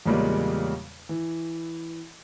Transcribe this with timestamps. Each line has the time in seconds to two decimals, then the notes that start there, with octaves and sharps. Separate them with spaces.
0.06 E2 A#2 C#3 G3 G#3 A#3
1.09 E3